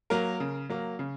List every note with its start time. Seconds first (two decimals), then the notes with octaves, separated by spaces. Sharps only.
0.10 F#3 A#3 A#4
0.40 C#3
0.69 F#3 A#3
0.99 C#3